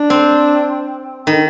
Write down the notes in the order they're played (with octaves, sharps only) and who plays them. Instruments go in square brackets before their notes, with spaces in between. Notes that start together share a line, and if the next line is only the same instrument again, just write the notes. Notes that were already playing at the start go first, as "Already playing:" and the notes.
Already playing: [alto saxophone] D4
[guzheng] C4
D#3